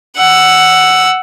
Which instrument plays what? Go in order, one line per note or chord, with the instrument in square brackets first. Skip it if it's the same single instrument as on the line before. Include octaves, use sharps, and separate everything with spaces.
[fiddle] F#5 E6